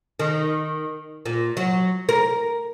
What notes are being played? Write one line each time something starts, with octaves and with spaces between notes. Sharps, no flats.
D#3
A#2
F#3
A#4